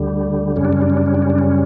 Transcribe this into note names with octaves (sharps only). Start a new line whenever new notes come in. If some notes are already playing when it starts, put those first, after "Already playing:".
Already playing: D2 D3 G3
F#2 C#3 G3 C#4
D4
C#4
D4
C#4
D4
C#4
D4
C#4
D4
C#4